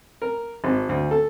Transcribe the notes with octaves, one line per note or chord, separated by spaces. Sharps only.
A#4
G#1
D2
A4